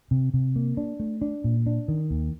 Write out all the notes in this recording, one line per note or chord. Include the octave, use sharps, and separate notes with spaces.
C3
C3
A#3
D4
A3
D4
A#2
D4
D#3
D#2